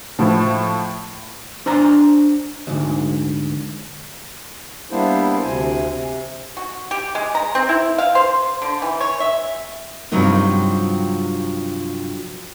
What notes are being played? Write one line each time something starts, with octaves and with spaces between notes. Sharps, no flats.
A2 F3
D4 C5 G#5 A#5
D2 G#2
G3 A#3 B3 D4 E4 C5
D2 C3 G#5
C3
F#4
G4
G#3
A#5
C4
E4
F5
C5
D3
E3
C#5
E5
G2 C3 F3 F#3 B3 D#4